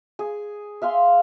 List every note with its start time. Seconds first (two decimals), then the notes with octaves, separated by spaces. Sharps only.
0.19 G#4
0.82 E5 F5 G#5 C6